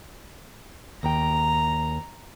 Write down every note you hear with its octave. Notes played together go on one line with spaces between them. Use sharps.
D#2 G5 A#5